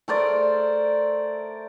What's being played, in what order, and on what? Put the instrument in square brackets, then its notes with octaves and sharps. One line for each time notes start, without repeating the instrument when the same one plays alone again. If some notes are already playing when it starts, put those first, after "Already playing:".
[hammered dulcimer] A3 A#4 C5 D5